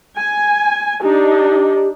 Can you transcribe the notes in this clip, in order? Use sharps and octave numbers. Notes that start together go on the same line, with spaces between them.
G#5
D4 D#4 G4